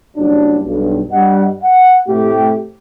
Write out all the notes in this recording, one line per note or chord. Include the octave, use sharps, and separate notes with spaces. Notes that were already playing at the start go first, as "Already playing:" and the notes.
F#1 G2 F#3 D4
B1 G2
G2 G3 D#5 F#5
F#5
A2 C3 A3 G4